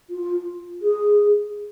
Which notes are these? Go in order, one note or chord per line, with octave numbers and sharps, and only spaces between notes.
F4
G#4